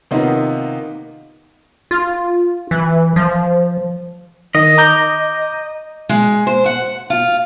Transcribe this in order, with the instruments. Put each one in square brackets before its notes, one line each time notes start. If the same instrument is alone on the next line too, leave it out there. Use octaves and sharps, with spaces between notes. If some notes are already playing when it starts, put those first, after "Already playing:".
[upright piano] C3 D#3 A#3 B3 D#4 F4
[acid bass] F4
E3
F3
[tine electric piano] D#3 [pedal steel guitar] D#5
[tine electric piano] A#5 D6 G6
[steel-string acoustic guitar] G#3
C5
F#5
F4